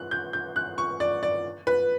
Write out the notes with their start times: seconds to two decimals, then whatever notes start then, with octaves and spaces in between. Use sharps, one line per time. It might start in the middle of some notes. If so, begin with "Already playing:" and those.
Already playing: F#6
0.11 G6
0.33 G6
0.56 F#6
0.78 C#6
1.00 D5
1.23 D5
1.67 B4